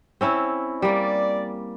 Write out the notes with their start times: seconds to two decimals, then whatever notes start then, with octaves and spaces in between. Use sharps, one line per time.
0.21 C4 C#4 E4
0.82 G3 A#3 D5